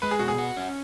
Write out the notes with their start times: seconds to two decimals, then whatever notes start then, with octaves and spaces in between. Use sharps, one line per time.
0.02 G#3 B4
0.11 G#4
0.19 B2 F#4
0.28 G#4
0.38 F#4
0.56 C#4